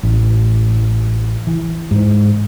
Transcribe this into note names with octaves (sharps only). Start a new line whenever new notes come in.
A1
E3
G#2